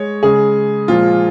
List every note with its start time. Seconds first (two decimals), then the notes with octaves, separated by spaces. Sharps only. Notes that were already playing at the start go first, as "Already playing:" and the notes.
Already playing: G#3 C#5
0.23 C#3 G#3 G#4
0.88 A#2 F3 G#3 F4